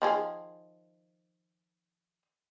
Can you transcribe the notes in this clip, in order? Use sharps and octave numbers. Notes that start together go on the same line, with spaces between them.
D#3 F3 G#4